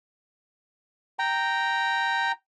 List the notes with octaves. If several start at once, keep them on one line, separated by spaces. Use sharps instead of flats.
G5 A#5